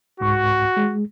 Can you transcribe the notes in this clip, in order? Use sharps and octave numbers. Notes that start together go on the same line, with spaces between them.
C2 G#2 F#4 C#6
G#3